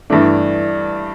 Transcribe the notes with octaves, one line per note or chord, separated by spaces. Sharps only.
G2 E3 A3 D4